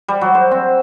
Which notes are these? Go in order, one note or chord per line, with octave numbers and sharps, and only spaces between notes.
G3
F#3
C5
C4